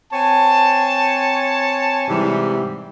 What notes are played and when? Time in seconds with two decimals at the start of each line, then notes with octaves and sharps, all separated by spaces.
0.13 C4 C#5 G#5 A5
2.08 G#2 C3 E3 G3